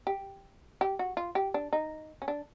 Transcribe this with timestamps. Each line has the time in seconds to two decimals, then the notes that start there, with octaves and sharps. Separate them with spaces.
0.07 G4
0.81 G4
0.99 F#4
1.17 F4
1.35 G4
1.54 D4
1.73 D#4
2.22 C#4
2.28 D4